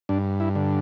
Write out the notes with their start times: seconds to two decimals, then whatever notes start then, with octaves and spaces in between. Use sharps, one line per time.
0.09 G2 D4
0.40 E4
0.55 D3